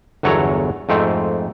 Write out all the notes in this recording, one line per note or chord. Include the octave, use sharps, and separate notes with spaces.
G1 E2 F#3 A4 C#5 A#5
F2 G#2 A3 C4